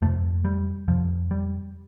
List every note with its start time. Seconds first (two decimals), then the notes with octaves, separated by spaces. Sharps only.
0.02 F2 C3 A3
0.45 G3
0.88 F2 C3 F3
1.31 G3